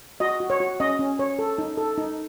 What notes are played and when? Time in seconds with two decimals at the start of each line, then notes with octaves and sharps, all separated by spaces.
0.20 F#4 D#5
0.40 F#4
0.50 C#5
0.60 F#4
0.80 C#4 D#5
0.99 C#4
1.19 C#5
1.39 A4
1.58 D#4
1.77 A4
1.98 D#4